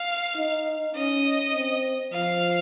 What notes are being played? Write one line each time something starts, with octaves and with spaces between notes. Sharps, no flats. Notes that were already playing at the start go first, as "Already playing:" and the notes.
Already playing: F5
D#4
C#4 D#5
C4
F3 F5